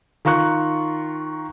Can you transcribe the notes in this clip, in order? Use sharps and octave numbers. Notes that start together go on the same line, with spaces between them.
D#3 F4 A#5 C#6 F#6